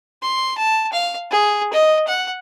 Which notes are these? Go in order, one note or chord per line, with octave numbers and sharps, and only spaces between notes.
C6
A5
F5
G#4
D#5
F#5